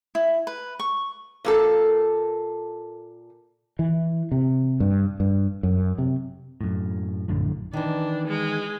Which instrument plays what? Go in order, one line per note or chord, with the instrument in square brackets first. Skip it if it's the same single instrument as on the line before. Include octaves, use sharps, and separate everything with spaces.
[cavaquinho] E4
B4
C#6
[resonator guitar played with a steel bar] A#2 A#3 A4
[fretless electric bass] E3
C3
G2
G2
F#2
C3
[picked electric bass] F#2 A2
A#1 F#2 A2 D3
[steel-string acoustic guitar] D#3 E3 [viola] D4
[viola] G#3